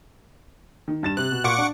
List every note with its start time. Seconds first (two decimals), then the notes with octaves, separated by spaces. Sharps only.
0.88 D#3
1.03 G2 A6 E7
1.17 C3 F#6
1.31 B2
1.44 A#2 F#5 C#6 D6
1.58 D4